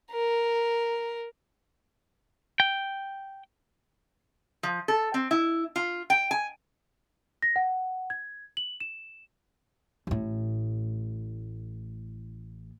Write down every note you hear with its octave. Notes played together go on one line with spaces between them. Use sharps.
A#4
G5
F3
A4
C4
E4
F4
G5
G#5
A#6
F#5
G#6
F#7
E7
A1 A2